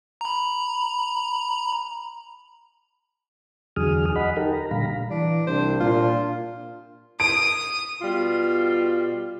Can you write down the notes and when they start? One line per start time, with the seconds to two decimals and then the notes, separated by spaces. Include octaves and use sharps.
0.21 A#5 B5
3.76 E2 D3 F#3 G#4 D#6 F6
4.16 D#5 F#5 B5
4.37 D#4 G4 A4 A#4
4.53 A#5
4.71 A#2 D3 G3 F5 A#5 B5
5.11 E3 D4
5.47 C2 D4 C5
5.80 A#2 F4
7.20 D#6 D7
8.02 B2 G3 F4